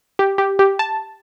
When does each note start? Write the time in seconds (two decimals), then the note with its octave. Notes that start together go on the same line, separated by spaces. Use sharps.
0.19 G4
0.38 G4
0.59 G4
0.79 A5